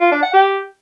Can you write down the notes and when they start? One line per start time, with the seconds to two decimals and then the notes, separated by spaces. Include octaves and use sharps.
0.01 F4
0.12 D4
0.23 F#5
0.33 G4